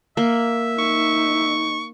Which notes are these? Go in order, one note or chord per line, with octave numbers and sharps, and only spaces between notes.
A#3 E5
D#4 C#6